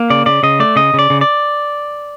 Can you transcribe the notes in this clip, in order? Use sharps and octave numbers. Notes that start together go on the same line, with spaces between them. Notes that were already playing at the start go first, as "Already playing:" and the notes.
Already playing: A#3
C#3 D5
C#3 D5
C#3 D#5
A3 D5
C#3 D#5
C#3 D5
C#3
D5